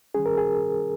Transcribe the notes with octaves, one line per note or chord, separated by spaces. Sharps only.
D#3 G3 C#4 G#4
A#4
G#4